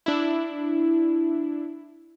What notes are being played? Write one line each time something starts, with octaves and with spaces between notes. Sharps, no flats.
D4 E4